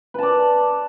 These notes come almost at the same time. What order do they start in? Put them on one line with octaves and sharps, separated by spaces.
B4 A5 D5